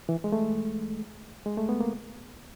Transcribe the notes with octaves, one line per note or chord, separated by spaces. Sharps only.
E3
G#3
A3
G#3
A3
B3
A#3